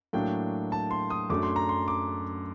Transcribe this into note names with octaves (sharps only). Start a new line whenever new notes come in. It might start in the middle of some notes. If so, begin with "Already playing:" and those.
A2 F#3 A#3 D4 G5
A5
C6
D#6
F#2 F#3 A3 D4 D6
C6
A#5
C6
D6